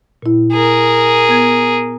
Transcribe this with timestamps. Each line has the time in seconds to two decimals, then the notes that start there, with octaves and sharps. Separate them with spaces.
0.22 A#2 E4
0.53 G#4 A#4
1.29 B3 G#6